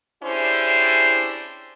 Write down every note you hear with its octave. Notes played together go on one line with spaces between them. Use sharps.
C#4 D4 E4 G4 G#4 C5